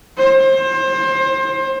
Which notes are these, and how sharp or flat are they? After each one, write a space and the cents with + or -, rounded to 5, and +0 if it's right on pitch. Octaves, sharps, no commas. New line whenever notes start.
C5 +25